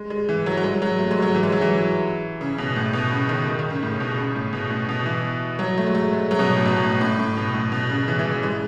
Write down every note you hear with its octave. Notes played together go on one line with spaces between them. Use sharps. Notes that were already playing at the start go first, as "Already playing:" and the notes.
Already playing: G#3
G#3
E3
F#3
F#3
G#3
F#3
A3
G#3
F#3
E3
G#3
F#3
E3
C#3
B2
A2
B2
C#3
D#3
D#3
D#3
C#3
A2
B2
C#3
A2
B2
A2
B2
E3
F#3
A3
G#3
A3
G#3
F#3
B2
A2
B2
A2
A2
A2
B2
A2
B2
C#3
E3
E3
E3
G#3